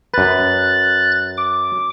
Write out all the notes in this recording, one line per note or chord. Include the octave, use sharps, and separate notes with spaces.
F#2 B4 F#6 A6
D6